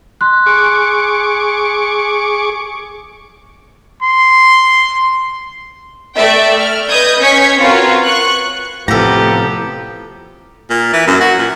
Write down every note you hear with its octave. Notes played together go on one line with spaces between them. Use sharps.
C6 F#6
G#4 C#6 D6
C6
A3 D5 E5 G5
F6
B4 D#5 D#6 G6 G#6
C#4 C#5 G#6 B6 C#7
C4 F4 F#4 A#4 B4 C#5
C#6 F#6
A1 A2 C3 F3 B3 G4 A4 A#5
A#2
E3
F#2
F#4
A#2